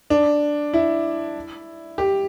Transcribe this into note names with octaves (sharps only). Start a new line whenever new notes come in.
D4
E4
G4